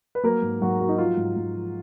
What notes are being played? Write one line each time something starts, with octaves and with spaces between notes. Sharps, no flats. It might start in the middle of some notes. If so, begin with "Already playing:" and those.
B4
F#3 A#3 A#4
G#2
G#2 F#3 F#4
F#3
D#4
F3 F4
G#2
G#2
F3